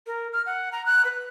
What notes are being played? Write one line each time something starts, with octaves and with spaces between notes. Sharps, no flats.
A#4
F6
F#5
A#5
F#6
B4